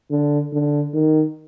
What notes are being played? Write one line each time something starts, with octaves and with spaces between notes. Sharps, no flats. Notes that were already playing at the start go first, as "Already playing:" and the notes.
D3
D3
D#3